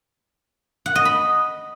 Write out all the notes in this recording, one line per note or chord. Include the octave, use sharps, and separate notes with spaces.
F#5
D#5
B5